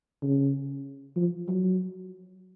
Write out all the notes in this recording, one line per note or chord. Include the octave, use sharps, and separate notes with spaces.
C#3
F3
F#3